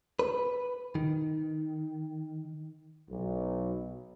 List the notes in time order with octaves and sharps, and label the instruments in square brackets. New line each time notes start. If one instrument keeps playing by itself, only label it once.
[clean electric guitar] B4
D#3
[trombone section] B1